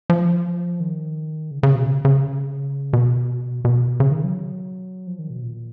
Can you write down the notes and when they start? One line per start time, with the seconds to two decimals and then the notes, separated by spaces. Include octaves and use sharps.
0.10 F3
0.80 D#3
1.51 C#3
1.63 C#3
1.75 B2
1.86 C#3
2.05 C#3
2.93 B2
3.65 B2
4.00 C#3
4.11 D#3
4.24 F#3
5.07 F3
5.19 D#3
5.30 B2
5.43 A#2